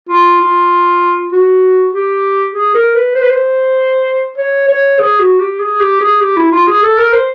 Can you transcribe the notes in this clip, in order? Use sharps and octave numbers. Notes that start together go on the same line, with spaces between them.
F4
F4
F#4
G4
G#4
A#4
B4
C5
B4
C5
C#5
C#5
G#4
F#4
G4
G#4
G4
G#4
G4
E4
F4
G#4
A4
A#4
C5